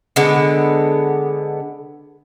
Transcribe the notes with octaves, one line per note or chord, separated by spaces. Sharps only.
D3 G#3 B3